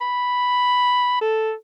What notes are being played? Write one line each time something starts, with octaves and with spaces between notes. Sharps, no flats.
B5
A4